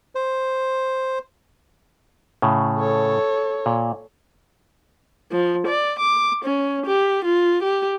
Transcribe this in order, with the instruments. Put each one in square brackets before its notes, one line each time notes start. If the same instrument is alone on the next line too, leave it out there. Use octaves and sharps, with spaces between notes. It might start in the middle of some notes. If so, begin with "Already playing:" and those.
[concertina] C5
[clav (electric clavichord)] A2 C#3
[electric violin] A4 C#5
[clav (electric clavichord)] A#2
[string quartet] F3
D5
D6
C#4
G4
F4
G4